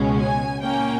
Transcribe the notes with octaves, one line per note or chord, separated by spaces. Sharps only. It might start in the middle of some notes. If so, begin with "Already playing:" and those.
Already playing: C#2 B2 G#3 C#4
G#5
A#2 A#3 C#4 G5